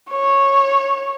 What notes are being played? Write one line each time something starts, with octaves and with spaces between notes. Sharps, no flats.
C#5